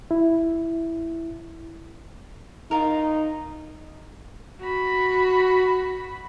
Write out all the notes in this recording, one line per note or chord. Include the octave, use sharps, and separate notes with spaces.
E4
D#4 F4 F#4 A#4
F#4 B5